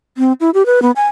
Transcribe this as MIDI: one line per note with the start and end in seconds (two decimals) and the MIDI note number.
0.18 0.33 60
0.40 0.50 64
0.54 0.66 67
0.66 0.82 71
0.82 0.91 59
0.96 1.08 80